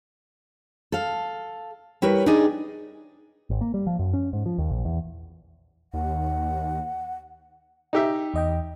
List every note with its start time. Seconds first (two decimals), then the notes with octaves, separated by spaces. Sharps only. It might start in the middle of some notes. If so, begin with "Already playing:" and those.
0.92 A4 F5
2.02 G3 E4 A#4 B4 C#5
2.26 D4 D#4 G4 G#4 D5 D#5
3.50 G#1
3.61 A#3
3.74 G3
3.87 F3
3.99 F#2
4.13 C#4
4.33 G#2
4.46 F3
4.58 D#2
4.70 A#1
4.85 E2
5.93 D#2 F#5
7.93 D#4 G4 E5
8.34 E2 D#5 G5